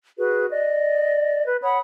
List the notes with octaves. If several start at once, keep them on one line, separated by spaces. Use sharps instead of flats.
F#4 G#4 B4
D5 D#5
B4
C#5 F#5 B5 D#6